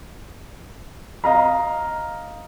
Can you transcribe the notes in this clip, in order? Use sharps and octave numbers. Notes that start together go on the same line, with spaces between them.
D#5 F5 A#5